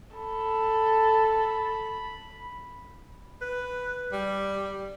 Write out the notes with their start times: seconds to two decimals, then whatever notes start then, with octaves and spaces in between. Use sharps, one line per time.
0.16 A4 B5
3.42 B4
4.12 G3